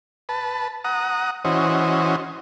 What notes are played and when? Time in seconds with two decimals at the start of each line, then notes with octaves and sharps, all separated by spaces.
0.29 B4 A5
0.84 F#5 A#5 D#6
1.45 E3 C#4 F#4 C5 D#5